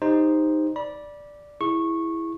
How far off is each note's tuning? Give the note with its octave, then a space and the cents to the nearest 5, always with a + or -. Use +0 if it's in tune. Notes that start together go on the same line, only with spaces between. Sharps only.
D#4 +0 G4 +20 C5 +0
D5 +0 B5 -30
E4 +0 G#4 -10 C#6 -15